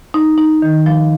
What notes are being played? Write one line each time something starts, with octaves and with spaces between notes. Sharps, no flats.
D#4
D#4
D#3
F3